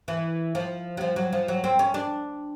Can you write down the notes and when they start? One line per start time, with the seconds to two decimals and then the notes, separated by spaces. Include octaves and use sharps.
0.08 E3
0.55 F3
0.97 F#3
1.01 F3
1.16 F#3
1.33 F3
1.48 F#3
1.64 C4
1.79 C#4
1.94 D4